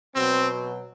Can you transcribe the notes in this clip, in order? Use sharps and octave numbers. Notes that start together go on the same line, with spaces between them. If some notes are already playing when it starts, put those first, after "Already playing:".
B2 F#3 C4